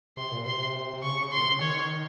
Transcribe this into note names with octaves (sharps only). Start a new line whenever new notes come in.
C3 C6
A#2
C3 C6
C3
C#3 C#6
A#2 C6
C3
C#3
D#3 C#5